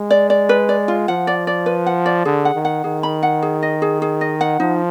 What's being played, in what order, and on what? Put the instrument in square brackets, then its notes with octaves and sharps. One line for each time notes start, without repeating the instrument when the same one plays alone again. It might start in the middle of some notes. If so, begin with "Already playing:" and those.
Already playing: [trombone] G#3
[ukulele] D5
D5
B4
D5
F4
[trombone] F3 [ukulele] F#5
[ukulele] D5
D5
B4
F#5
D5
[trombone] D3 [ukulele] G#4
[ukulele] F#5
[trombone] D#3
[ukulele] F#5
[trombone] D#3 [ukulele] G#4
[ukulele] B5
F#5
G#4
D#5
G#4
G#4
D#5
F#5
[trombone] F3 [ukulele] D#4